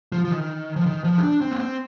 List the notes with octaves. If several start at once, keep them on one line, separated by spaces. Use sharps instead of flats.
F3
F3
D#3
F3
D#3
F3
D#4
D4
C4
A#3
C4